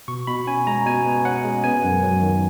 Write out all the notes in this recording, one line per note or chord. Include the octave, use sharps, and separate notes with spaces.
B2 C#6
B2 B5
C#4 G#5
G#3 A#5
B2 G#5
B2
C#4 F#5
G#3
B3 G#5
F#2
F#3
D#3